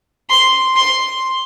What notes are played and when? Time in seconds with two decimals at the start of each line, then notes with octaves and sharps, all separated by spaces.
0.30 C6
0.76 C6